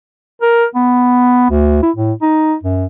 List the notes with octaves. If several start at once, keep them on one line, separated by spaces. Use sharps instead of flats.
A#4
B3
D2
E4
A2
D#4
F#2